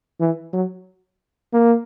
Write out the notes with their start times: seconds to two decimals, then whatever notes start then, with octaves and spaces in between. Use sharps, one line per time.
0.21 E3
0.53 F#3
1.53 A#3